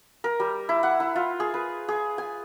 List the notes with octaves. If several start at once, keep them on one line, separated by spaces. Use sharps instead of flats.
A#4
G3
E4
F#5
E4
F4
G#4
B4
G#4
G#5